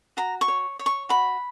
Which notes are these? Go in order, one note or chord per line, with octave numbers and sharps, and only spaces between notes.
F#4 A#5
C#6
C#5
C#5
C#6
F#4 B5